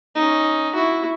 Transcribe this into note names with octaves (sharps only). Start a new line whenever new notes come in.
C#4 D#4
E4 F#4